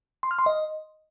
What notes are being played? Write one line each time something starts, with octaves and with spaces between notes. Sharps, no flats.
C6
F6
C6
D#5